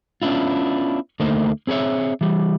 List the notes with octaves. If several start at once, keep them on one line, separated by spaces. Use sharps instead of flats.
B3 C#4 D4 E4 F4
D2 A3 A#3 D#4 C5
C4 G#4 B4 C#5 E5
E3 G3